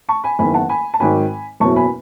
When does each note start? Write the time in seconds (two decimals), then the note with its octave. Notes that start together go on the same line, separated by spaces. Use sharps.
0.09 A5 C#6
0.24 G#5 B5
0.39 F#1 E2 D#3 G#5 B5
0.54 F#5 A5
0.69 G#5 B5
0.94 A5
1.00 G#1 G#2 D#3 F#3 G#5 B5
1.60 F#1 E2 B2 F#3 A5 C#6
1.76 G#5 B5